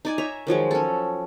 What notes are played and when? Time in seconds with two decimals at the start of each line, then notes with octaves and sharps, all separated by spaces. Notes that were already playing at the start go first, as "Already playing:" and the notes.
0.05 D#4 D5 G#5
0.18 C#5 E5 A#5
0.47 D#3 F3 F#3 G#3
0.71 C#4 A4